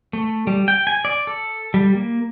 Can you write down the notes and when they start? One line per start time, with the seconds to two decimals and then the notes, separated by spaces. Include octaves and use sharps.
0.13 A3
0.47 G3
0.68 G5
0.87 G#5
1.05 D5
1.27 A4
1.74 G3
1.95 A#3